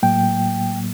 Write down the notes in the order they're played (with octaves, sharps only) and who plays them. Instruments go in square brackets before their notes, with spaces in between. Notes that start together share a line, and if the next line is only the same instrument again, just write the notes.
[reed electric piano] A2 F#3 A#3 G5